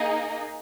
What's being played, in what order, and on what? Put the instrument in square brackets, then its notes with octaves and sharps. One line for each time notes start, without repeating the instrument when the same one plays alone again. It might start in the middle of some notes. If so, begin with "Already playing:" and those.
Already playing: [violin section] A#3 D#4 G#4 D#5